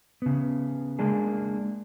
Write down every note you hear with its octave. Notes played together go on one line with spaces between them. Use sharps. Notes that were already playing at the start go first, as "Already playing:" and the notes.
C#3 B3
G#3 A#3 D4 G#4